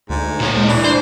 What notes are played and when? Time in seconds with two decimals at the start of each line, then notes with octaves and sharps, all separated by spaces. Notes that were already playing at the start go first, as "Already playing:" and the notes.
0.10 D2 G#2
0.40 A#2 C#5
0.57 E2 G#3
0.69 E3 D4
0.85 C5